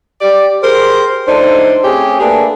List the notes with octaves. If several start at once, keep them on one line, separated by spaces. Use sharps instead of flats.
G4 D5
G4 G#4 A#4 C5
A2 F3 D4 D#4 A4 C5
A3 C4 C#4 G4 G#4
A3 A#3 D4 G#4 A4 B4